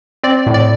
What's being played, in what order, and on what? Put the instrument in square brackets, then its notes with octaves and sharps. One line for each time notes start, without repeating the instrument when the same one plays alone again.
[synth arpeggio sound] C4 D5
A2
D5